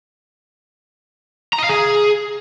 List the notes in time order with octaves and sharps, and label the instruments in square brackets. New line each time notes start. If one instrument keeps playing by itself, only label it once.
[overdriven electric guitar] A#5
D#5
F5
G#4